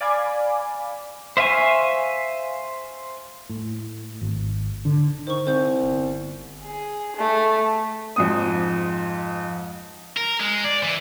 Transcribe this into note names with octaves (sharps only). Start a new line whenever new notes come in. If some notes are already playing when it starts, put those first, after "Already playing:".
D5 F5 G#5 B5 D6
C5 E5 F5 G#5 C#6
A2
G#1
D3
D#3 C5 C#6
C2 C5 G6
G1
G#4
A3
F2 G#2 D#6
A#4
G#3
D5
E3